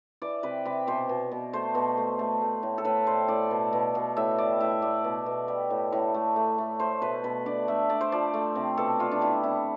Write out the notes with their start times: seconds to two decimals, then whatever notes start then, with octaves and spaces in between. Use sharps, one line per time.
0.22 E3 D5
0.43 C3 B4
0.65 C3 B4
0.87 B2 C5
1.09 B2
1.32 B2
1.53 A3 C5
1.75 B2
1.98 A3
2.19 A3
2.42 A3
2.63 A2
2.78 A4
2.85 A2 B4
3.07 G3 C5
3.28 A2 D5
3.51 B2
3.73 B2
3.95 B2
4.16 A2 E5
4.38 G3 D5
4.61 A2 E5
4.82 A3 D5
5.04 B2
5.26 B2
5.48 G3
5.70 A2
5.93 A2
6.14 A3
6.36 A3
6.58 A3
6.80 A3 C5
7.02 B2 B4
7.23 B2 B4
7.46 D3 D5
7.68 A3 E5
7.89 A3 D5
8.01 C5
8.12 F3 D5
8.34 A3
8.55 C3
8.77 B2 A4
8.99 G3 F4
9.11 D4
9.21 G3 E4
9.43 C3 E4